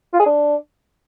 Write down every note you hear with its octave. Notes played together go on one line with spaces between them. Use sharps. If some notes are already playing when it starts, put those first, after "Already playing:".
F4
G#4
D4